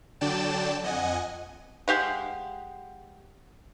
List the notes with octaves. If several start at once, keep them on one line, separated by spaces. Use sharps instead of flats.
D3 F#3 D5 G5 A5 E7
F2 D#5 F#5 G#5
G#3 G4 F5 F#5